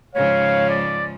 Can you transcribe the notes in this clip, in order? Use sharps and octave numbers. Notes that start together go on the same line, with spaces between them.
G#2 C#3 F3 C#5 F5
D5